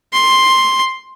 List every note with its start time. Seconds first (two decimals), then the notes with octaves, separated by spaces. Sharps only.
0.13 C6